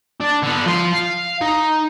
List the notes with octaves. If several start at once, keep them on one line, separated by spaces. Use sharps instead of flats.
D4
D3 B3
F3 C6
F5
D#4